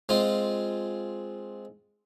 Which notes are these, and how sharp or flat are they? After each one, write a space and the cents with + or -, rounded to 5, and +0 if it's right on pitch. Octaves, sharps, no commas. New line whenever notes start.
G#3 +0 C4 +0 F4 +0